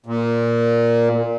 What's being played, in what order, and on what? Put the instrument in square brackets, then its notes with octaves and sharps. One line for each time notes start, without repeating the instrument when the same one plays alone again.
[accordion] A#2